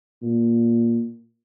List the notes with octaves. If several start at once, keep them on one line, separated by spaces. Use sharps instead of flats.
A#2